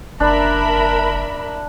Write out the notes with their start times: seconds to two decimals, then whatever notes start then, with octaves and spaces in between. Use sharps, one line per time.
0.20 F#1 D4 A#4 E5 B5